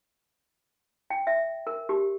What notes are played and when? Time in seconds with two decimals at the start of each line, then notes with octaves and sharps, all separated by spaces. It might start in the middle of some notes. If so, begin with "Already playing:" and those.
1.10 G5
1.27 E5
1.67 A#4
1.89 G4